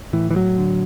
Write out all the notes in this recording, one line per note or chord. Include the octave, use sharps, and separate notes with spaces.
A2 E3
E3
F#3
D3